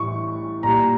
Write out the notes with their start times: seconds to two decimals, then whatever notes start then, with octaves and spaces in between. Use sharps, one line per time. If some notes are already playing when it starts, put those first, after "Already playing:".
Already playing: A2 E3 G3 C#6
0.63 A#2 G3 A#5